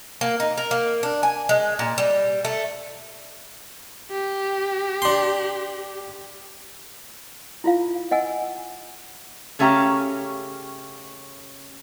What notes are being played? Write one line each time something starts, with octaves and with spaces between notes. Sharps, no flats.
A#3
D#4
A#4
A#3
D4
G#5
G#3
A#2
G3
A3
G4
D4 C6
E4 F4 F5
D#5 F#5 G#5 E6
C#3 A3 C#4 G4 A#5